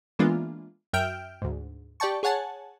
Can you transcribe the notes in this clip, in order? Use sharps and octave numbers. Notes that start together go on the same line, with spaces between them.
E3 G#3 A#3 B3 D4 F4
F#2 E5 G5 F6 G6 D7
D2 G#2
G4 D5 G5 A5 C#6
G#4 C#5 F#5 G#5 A5